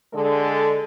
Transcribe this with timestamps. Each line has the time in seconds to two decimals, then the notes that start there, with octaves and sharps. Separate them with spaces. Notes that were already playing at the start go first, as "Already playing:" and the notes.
0.14 D3 G#3 A4